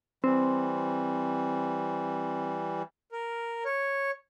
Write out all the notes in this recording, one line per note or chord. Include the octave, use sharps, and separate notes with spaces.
E3 G3 C4
A#4
C#5